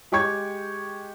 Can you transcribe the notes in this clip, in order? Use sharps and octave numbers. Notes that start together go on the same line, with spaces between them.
G#3 G4 G5 C#6 G#6